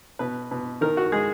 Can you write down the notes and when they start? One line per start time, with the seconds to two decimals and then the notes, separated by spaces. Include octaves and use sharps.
0.19 B2 B4
0.51 B2
0.81 D#3 A#4
0.97 F#4
1.12 G#3 G#4